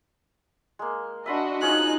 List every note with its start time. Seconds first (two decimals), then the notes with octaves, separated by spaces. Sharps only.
0.79 G#3 A#3
1.26 D4 F#4 D#5 E5 B5 C6
1.62 F3 C#4 D#4 G#4 F#6